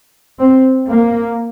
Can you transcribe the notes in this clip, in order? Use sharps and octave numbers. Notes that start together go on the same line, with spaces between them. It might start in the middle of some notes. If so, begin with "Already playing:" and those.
C4
A#3